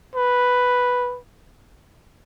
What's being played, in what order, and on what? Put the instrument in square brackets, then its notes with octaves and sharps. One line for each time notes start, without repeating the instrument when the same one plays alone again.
[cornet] B4